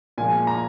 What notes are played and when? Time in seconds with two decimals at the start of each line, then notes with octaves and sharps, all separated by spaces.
0.18 A#2 F3 G#3 G#5
0.47 A#5